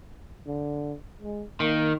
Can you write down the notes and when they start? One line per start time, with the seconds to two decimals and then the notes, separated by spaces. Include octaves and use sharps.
0.47 D3
1.20 G#3
1.60 D#3 A#3